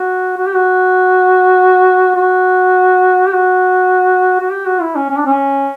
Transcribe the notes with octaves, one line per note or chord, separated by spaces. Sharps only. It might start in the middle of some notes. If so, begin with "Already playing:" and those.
Already playing: F#4
F#4
G4
F#4
F#4
G4
F#4
F#4
G4
F#4
E4
C#4
C#4
D4
C#4